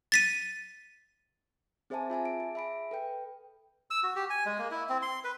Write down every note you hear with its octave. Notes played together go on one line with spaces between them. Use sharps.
A6 B6 D#7
C4 G#4 C5 E5 G#5 A5
F4 E5 G#5 A5
D7
G#4
E5 B5 D7
A4 B4 G5
E6
F#4
G4
G#5
G#3
A#3
E4
C4
C6
B4